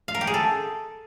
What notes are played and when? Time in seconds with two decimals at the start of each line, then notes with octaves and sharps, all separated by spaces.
0.08 F5
0.15 A#4
0.21 G4
0.27 G#4
0.34 A4